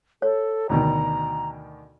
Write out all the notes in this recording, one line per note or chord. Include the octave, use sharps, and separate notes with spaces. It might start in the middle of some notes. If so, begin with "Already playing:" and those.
A4 C#5
D2 B2 D#3 A#5